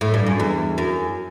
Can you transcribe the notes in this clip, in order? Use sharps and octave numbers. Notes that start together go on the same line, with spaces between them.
A2
G2
F#2
E2
F#2